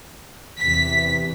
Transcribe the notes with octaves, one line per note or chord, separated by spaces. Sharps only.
E2 C3 E3 B6